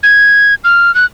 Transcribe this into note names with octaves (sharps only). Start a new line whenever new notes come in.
G#6
F6
F#6